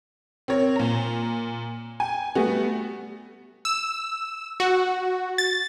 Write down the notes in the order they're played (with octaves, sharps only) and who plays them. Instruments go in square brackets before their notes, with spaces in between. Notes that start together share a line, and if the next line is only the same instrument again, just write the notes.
[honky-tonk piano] C4 A#4 C#5
A#2 A#5
G5 G#5
G3 A3 B3 F#4
[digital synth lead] E6
F#4
A6